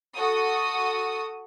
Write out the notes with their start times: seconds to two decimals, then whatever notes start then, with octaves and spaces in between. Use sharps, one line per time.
0.18 F#4 A4 D#6